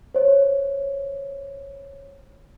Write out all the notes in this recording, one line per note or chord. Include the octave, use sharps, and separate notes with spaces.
C5 C#5